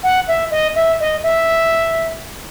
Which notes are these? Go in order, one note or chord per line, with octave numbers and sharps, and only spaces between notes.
F#5
E5
D#5
E5
D#5
E5